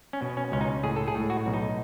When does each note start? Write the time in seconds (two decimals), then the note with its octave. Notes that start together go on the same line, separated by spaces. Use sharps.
0.13 C#4
0.22 B2
0.37 C#4
0.52 C#2 C#4
0.61 D#4
0.84 A2 G#4
0.96 A4
1.08 G#4
1.15 A2
1.30 F#4
1.46 B1
1.54 D#4